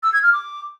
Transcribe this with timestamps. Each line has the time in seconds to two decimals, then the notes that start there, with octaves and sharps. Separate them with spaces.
0.03 E6
0.13 G#6
0.23 F6
0.33 D6